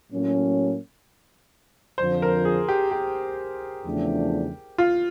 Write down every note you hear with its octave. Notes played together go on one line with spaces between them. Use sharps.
A2 F#3 A#3 C#4
F2 D3 F3 C5
A#4
G#4
G4
G4
E2 C#3 F3 A3 D4
F4